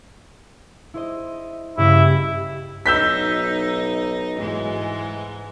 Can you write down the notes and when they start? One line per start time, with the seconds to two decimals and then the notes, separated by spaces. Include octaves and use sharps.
0.94 E4 C5 D#5
1.77 G2 C#3 G3 E4
2.86 B1 D#4 E6 G6 B6
4.37 G#2 E3 G#3